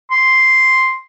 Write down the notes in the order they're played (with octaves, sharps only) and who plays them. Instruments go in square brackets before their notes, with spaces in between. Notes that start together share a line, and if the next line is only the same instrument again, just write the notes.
[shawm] C6